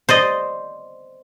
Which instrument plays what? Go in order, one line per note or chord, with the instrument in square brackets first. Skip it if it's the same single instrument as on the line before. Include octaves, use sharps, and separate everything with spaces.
[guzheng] C5 D5 D#5